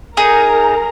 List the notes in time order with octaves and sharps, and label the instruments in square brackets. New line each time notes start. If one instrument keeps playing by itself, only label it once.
[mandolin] D#4 G#4 [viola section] A#4 A#5